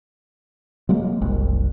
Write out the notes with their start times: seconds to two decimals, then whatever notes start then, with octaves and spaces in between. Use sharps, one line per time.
0.89 F#3 G#3 A#3
1.21 F#1 C2